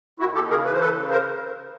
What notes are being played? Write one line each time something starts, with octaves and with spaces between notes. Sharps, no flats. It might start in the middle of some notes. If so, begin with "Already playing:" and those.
D#2 E4 F#4
D#2 G4 A4
C#3 G#4 A#4
E3 B4
C5
C#3 A4 B4
C#3
A#4 C5